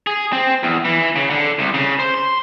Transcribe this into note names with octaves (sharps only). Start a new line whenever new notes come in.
G#4
C4
E2
E3
C#3
D3
C2
C#3
C5
C6